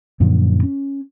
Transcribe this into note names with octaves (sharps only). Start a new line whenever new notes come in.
F#2 A#2 D3 F3
C#4